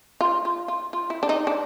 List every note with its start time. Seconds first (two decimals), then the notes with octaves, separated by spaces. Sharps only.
0.21 F4
0.45 F4
0.68 F4
0.93 F4
1.10 E4
1.23 D4
1.29 D#4
1.47 D4